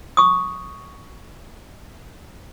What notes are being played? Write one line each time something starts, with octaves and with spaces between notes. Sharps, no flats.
C#6 D#6